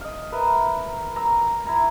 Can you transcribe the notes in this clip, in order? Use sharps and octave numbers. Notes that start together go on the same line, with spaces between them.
D#5 F5
A#4 B4 E5
A#5 E6
E4 A#5